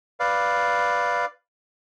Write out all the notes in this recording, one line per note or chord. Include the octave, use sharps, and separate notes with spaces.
B4 D5 F5